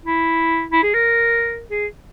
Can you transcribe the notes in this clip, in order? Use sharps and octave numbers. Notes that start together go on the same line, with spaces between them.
E4
E4
G#4
A#4
G#4